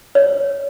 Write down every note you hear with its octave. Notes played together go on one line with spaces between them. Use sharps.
C#5